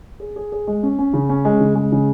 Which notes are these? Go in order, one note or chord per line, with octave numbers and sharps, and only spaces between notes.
G#4
G#4
G#4
G#3
C#4
C#4
C#3
C#4
G#3
C#3
G#3
C#3